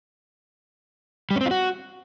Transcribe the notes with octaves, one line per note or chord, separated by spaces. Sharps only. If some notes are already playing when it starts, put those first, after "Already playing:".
G3
C#4
C4
F4
F#4